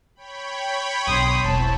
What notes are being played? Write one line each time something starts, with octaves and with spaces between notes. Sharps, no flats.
C#5 G5 B5
B1 D3 C6 D#6
E1 B1 C4 E4 C#5 A5